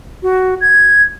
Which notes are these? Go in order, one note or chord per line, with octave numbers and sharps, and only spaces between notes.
F#4
G#6